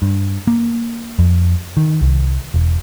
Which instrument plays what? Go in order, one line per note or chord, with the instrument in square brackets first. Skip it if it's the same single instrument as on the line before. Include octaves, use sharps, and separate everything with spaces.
[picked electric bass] G2
A#3
F2
D#3
C2
E1